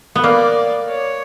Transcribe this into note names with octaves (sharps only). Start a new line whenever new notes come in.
B3
A#3 D5
C#5